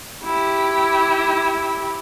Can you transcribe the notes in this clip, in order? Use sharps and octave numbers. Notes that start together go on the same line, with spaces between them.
E4 G4